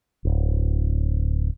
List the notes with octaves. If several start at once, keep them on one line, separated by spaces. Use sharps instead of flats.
D1